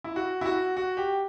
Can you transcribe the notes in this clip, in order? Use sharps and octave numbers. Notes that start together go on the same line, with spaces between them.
E4
F#4
E4
F#4
F#4
G4